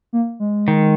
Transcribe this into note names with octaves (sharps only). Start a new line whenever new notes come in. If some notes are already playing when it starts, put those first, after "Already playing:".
A#3
G#3
D#3